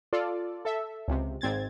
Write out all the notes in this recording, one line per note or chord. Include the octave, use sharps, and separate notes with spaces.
F4 A4 D5
A4 E5
C#2 C3
G#1 C4 G#6 A6